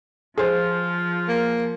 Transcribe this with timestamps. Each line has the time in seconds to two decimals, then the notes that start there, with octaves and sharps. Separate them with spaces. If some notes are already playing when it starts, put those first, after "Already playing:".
0.38 F3 F4 G#4 C5
1.28 A#3